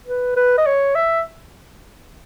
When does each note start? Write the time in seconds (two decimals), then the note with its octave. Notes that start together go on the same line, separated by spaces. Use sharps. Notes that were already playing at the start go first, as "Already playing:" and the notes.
0.07 B4
0.36 B4
0.58 D#5
0.67 C#5
0.95 E5